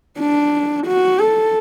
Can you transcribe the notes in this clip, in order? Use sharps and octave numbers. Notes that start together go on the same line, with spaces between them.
D4
F#4
A4